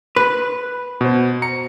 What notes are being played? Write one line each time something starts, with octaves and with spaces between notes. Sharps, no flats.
B4
B2 C5
A#5 C#7